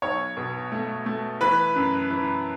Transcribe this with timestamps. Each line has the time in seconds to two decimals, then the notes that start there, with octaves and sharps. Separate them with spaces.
0.02 B1 C#5 C#6
0.37 B2
0.72 A3
1.06 A3
1.41 E3 B4 B5
1.75 F#2
2.10 E3